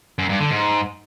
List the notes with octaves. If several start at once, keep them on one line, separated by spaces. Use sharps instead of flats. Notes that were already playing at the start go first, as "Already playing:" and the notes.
F#2
G2
D3
G#2